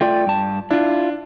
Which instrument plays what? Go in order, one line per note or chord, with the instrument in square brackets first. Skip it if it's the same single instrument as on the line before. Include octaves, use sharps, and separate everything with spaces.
[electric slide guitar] A3 F4 D5 [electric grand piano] G5
[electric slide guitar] G2 A5
[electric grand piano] D4 [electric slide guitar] E4 F4